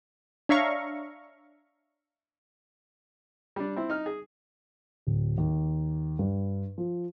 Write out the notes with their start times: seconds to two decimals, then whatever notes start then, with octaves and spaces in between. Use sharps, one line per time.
0.49 D4 C#5 E5 F5 A#5 C#6
3.56 G3 D4
3.77 C4 E4
3.90 D#4 F6
4.06 G#4
5.07 D1
5.38 D#2
6.19 G2
6.78 F3